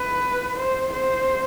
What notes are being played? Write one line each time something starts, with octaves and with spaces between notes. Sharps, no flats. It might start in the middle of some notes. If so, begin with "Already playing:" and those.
Already playing: B4
C5
C5